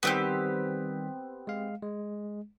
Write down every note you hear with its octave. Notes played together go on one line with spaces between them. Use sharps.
D#3 G3 B3 C4 G4 B6
G#3 F5
G#3